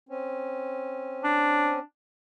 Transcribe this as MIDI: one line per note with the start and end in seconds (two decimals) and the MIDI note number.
0.09 1.79 60
0.09 1.79 61
1.24 1.81 62